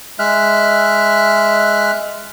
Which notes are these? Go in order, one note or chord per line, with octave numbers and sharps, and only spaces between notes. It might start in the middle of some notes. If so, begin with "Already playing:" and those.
G#3 E5 F6 F#6